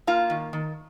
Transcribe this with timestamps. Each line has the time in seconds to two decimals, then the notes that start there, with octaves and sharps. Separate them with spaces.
0.07 A#3 F4
0.30 D#3
0.53 D#3